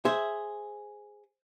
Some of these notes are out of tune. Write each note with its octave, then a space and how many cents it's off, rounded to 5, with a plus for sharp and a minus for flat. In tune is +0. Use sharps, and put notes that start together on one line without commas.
G#4 +0 C5 -5 E5 +0